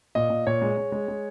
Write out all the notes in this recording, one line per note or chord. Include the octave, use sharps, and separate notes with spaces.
A#2 D#5
A#2
A#2 C#5
G#3
G#3
G#3
G#3